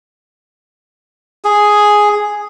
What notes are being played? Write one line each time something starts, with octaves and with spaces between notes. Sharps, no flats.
G#4